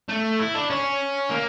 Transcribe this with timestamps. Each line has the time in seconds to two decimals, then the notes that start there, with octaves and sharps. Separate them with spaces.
0.09 A3
0.40 E4
0.55 D4
0.70 C#4
1.31 A#3